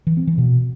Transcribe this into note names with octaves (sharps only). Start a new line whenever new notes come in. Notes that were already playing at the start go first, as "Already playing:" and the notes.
E3
C4
E3
B2